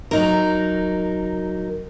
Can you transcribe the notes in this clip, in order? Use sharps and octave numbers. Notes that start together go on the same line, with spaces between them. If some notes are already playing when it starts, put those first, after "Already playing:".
F#3 D#4 A#4